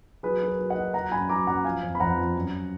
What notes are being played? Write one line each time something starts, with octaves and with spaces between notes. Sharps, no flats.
F#3 G#4 B4
F#3
A#4
F#3
D#5 F#5
F#3
F#3 F#5 A#5
F#2 G#5 B5
F#3 A#5 D6
F#2 F#5 A#5
F3 F5 G#5
F2
B5
F2 F#5 A#5
F3
F#2